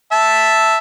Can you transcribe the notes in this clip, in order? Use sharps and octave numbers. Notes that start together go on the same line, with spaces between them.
E5 A5